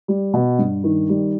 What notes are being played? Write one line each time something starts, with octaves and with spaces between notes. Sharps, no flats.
G3
B2
G2
D#3
G3